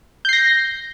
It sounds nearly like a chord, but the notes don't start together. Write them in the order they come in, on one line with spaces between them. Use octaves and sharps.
G6 C7 A#6